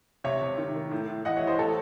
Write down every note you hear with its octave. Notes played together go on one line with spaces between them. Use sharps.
C3 C#5 E5
C3
D#3
D#3
A2
A2
E3 D#5 F#5
C#5 E5
E3
C5 D#5
A2 A4 C#5